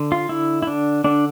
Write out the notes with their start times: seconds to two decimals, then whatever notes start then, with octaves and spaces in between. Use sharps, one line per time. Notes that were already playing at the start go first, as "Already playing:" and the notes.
Already playing: D3
0.12 F4
0.29 D3 E4
0.62 E4
0.67 D3 D4
1.04 D3 D4